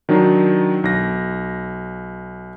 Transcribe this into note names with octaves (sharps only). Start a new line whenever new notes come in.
D#3 F#3 D4 D#4
B1 A#6